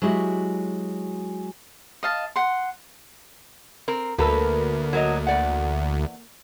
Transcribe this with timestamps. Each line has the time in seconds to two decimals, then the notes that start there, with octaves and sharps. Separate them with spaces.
0.02 F#3 G#3 E4 F#4 G4
2.03 D#5 F5 A5
2.36 F#5 C6
3.88 C4 A#4
4.18 D2 A#3 A4 B4
4.93 F#3 A#4 D#5
5.27 E2 D5 F#5